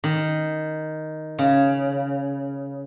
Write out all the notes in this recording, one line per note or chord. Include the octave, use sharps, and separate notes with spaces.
D#3
C#3